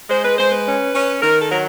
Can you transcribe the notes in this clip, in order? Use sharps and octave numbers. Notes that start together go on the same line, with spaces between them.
G#3 C5
B4
G#3 C5
B4
C#4
C#4
D#3 A#4
A4
F#3 A#4